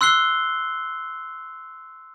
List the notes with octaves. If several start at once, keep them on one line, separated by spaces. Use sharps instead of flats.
C6 E6 F#6 C7 G7